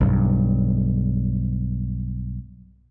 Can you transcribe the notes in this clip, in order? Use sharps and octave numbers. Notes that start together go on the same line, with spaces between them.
B1 G2